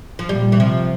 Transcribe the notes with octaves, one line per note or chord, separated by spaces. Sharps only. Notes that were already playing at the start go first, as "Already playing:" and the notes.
F3
A#2 G3
E3
C3 F3